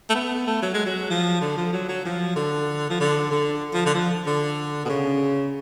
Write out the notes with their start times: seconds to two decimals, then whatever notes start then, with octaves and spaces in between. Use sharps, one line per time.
0.09 A3
0.15 B3
0.47 A3
0.62 F#3
0.74 G#3
0.86 F#3
1.10 F3
1.41 D3
1.57 F3
1.73 F#3
1.88 F#3
2.05 F3
2.36 D3
2.90 F3
3.00 D3
3.31 D3
3.74 F3
3.86 D3
3.95 F3
4.26 D3
4.85 B2
4.89 C#3